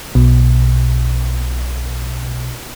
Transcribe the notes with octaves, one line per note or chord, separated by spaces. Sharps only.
B1 B2